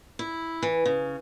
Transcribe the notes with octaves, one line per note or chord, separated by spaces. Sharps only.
E4
E3
C#3